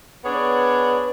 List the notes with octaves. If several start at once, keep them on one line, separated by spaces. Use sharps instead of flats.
B3 D4 G#4 C#5 D5